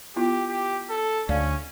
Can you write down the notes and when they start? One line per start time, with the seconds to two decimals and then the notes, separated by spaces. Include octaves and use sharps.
0.16 B3 E4 F4 G4
0.49 G4
0.90 A4
1.29 D2 C#4 D5 F5